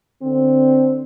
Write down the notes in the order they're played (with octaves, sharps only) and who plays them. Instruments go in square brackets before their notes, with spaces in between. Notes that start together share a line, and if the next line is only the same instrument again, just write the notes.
[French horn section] D3 C4